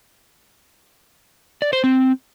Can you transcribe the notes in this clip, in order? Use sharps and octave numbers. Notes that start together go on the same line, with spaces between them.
D5
C5
C4